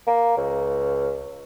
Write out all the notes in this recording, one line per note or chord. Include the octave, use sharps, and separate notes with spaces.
A#3
C#2